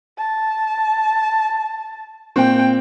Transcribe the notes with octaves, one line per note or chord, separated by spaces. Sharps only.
A5
A#2 C4 G5